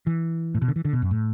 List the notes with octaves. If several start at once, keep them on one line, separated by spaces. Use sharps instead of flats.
E3
A2
B2
D3
E3
D3
B2
F#2
A2